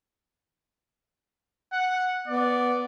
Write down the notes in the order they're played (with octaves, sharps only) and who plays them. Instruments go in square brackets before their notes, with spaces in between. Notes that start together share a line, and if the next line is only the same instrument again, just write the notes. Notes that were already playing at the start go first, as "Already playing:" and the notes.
[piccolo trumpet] F#5
[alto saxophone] B3 [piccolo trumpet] D5